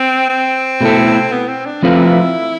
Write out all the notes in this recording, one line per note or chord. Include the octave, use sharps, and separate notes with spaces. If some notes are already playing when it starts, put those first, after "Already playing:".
Already playing: C4
C4
B2 A3 E4 A4
B3
C4
D4
F3 A3 C4 E4 F4 B4